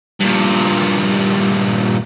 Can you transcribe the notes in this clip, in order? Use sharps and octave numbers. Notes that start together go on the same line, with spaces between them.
G2 A#2